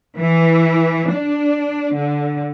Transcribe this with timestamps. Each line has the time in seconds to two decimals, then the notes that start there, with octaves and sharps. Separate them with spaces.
0.18 E3
1.12 D4
1.95 D3